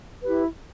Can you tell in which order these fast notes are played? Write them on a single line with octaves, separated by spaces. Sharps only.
B4 G4 E4